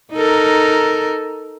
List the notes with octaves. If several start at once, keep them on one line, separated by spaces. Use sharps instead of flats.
D#4 A4 A#4